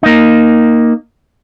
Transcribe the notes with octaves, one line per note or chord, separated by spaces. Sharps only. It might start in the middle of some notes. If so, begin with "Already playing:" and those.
A#3 D#4